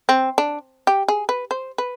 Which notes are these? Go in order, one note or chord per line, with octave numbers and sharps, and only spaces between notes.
C4
D4
G4
G#4
B4
C5
B4